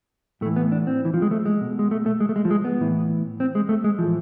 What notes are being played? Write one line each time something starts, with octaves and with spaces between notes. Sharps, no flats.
A2 E3 A3
B3
D4
C4
E3
F3
G#3
A3
G#3
B2
G#3
A3
A3
G#3
A3
G#3
F3
G#3
B3
A2 E3
C4
G#3
A3
G#3
A2 E3 F3